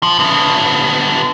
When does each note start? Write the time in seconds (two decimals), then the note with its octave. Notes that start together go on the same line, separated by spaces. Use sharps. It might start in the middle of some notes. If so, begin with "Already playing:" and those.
0.03 F3
0.19 D3 B3